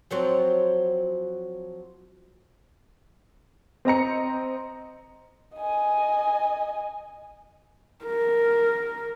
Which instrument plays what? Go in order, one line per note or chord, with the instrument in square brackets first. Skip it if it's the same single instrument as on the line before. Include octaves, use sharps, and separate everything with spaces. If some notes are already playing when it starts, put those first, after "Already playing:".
[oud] F3 F#3 C4
[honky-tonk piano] C4 D#5 A#5 C#7
[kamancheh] D#5 G#5
[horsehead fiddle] A#4